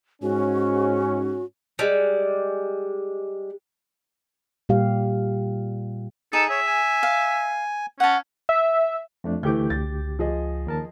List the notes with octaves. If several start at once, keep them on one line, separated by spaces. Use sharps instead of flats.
G#2 C#4 F#4
G3 G#3
A#2 G3 G4 F5
D#4 G#4 A4
C#5 E5
G#5
F5
C#4 F#5 A5
E5
F2 A3 D4
D2 E3 A3 G4 D6 G6
C#2 A6
F3 G#4 D#5
D#2 A#4 A5